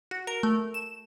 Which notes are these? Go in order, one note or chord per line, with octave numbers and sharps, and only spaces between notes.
F#4
A#4
A3
E7